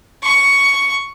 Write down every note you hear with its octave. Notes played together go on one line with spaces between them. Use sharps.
C#6